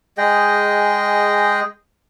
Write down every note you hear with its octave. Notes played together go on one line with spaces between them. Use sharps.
G#3 G#4 D#5 G5